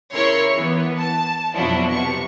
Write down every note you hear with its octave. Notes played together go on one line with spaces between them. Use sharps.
C#3 E4 A#4 C#5 C6
E3 B3
A5
F2 B2 F3 F#3 D4 E4
C3 B3 C#6